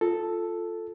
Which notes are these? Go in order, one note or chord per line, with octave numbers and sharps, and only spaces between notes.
F4 A4